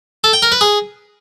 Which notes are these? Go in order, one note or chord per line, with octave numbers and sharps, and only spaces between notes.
A4
G5
A#4
B4
G#4